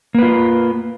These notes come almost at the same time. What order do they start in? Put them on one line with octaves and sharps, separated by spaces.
A#3 B4 F4